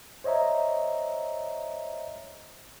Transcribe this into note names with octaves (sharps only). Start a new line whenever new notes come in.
C5 C#5 D#5 E5 A#5